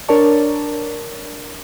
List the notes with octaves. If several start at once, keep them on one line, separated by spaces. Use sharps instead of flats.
D4 A#4 C#5 D5 A5 C#6